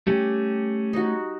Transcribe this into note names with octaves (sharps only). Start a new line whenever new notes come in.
A3 C#4 G4
D#4 F#4